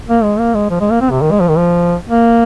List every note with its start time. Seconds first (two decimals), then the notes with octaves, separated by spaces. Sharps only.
0.08 A#3
0.23 G#3
0.39 A#3
0.55 G#3
0.70 F3
0.80 G#3
0.90 A#3
1.01 C4
1.11 C3
1.22 D#3
1.31 G#3
1.40 F3
1.48 D#3
1.57 F3
2.08 A#3